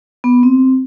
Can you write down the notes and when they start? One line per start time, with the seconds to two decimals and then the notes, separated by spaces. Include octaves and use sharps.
0.24 B3
0.43 C4